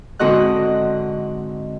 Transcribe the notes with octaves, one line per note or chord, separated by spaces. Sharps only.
G#2 D3 C4 F#4 D#5 F#6